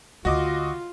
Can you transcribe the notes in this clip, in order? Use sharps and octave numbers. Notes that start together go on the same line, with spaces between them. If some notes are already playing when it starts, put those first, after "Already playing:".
D2 D3 F4 F#4 D#5 D6